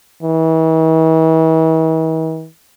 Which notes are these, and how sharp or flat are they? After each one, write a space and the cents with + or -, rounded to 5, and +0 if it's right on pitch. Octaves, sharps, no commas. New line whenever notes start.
E3 -45